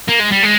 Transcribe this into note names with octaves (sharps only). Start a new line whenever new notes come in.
A#3
G#3
G3
G#3